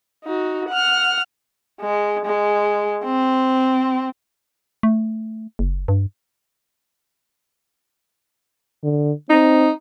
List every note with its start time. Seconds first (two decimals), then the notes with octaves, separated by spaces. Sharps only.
0.24 D#4 F#4
0.69 F#5 F6
1.81 G#3
2.25 G#3
3.04 C4
4.83 A3
5.59 F#1
5.88 G2
8.84 D3
9.30 C4 D#4